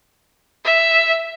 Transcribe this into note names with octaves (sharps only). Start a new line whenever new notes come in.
E5